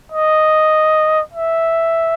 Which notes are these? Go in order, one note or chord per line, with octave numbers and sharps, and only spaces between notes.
D#5
E5